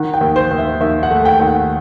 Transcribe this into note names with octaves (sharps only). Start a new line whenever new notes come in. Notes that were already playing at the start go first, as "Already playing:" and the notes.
Already playing: D#3 F#5
G5
D#2
C5
D#2
E5
D#2 E5
F#5
A3
G5
D#2 G5
F#5